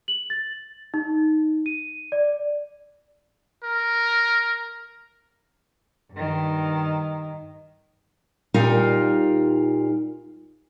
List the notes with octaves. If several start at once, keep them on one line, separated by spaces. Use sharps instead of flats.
F#7
A6
D#4
D#7
D5
A#4
G2 D#3
A#2 G3 D#4 F4 A#4 F5